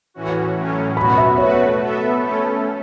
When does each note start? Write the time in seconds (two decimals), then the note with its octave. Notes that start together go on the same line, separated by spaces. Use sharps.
0.14 A2 E3 C#4 F#4
0.55 A2 F#3 C#4
0.97 B2 B3 F#4 B5
1.17 E5
1.38 A3 F#4 B4 C#5
1.79 B3 A4 E5
2.21 A3 C#4 A4